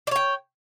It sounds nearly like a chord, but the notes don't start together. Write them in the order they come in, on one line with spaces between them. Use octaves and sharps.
D5 C#5 G5